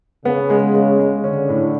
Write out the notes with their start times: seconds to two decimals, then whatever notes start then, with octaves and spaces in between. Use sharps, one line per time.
0.25 C#3 B3
0.50 G#3
0.74 G#3
1.00 G#3
1.24 D3 C#4
1.49 A2